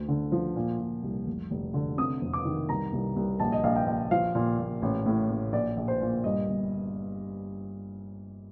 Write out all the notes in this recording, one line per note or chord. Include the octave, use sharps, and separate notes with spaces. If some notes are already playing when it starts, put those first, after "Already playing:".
Already playing: D2
D3
F3
A#2
A#2
C2
F1
F1
D3
C3 D#6
F2
D6
D#3
C2 A#5
C2
C2
A#1 A5
D#5
A#1 F5
G5
A#1
F3 F5
A#2
A#2
A1
A2
A1
A#1 D5
A#1
C5
A#2
G2 D#5
G1